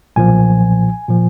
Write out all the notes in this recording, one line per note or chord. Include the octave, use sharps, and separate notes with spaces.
B1 A#2 F3 G#5
A#2 F3